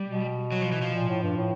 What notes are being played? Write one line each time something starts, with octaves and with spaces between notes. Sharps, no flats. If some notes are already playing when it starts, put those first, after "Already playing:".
Already playing: G3
B2
F#3
F3
E3
F3
A#2
A2
G2
A2